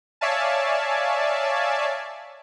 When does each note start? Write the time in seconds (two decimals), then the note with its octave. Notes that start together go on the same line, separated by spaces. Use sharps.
0.21 C#5 D5 E5 F5 G#5 A5